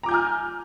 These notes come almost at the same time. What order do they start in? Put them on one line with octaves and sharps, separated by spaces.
A#5 D6 G6 G#5 F6